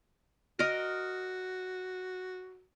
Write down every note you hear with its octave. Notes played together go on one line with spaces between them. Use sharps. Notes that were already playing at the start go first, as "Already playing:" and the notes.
F#4 A#4 D#5